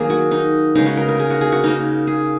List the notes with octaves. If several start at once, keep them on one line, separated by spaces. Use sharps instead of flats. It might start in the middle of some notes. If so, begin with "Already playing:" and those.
Already playing: D#3 F#3 A#3 G#4
F#4
D#4
C#3 G#3 D#4
F#4
A#4
A#4
G#4
F#4
G#4
F#4
C#3 A#3 D#4
G#4